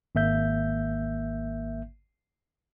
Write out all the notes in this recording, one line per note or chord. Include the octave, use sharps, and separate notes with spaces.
G#1 A#3 E5 G6